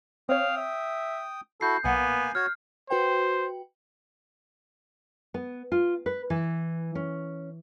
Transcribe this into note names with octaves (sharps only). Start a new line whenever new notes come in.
C4 C#5 F5 G5 D#6
E5
E4 F#4 A4 G6 C7
B1 A#2 A#3 B3 F#5 G#5
F#4 C#5 F6
F#4 B4 C5 G5
B3
F4
B4
E3
C#4